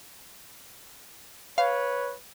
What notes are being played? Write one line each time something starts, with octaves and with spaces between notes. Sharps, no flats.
B4 C#5 F5